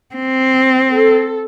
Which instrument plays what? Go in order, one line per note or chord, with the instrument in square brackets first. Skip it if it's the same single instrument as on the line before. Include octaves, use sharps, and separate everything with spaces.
[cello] C4
[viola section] A4